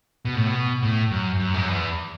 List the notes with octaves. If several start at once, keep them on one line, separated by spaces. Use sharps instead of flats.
B2
A2
B2
A2
F#2
F#2
G#2
F#2
E2